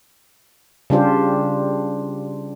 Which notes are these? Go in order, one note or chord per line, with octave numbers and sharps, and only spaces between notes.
C#3 G3 D4 F4 G4 C5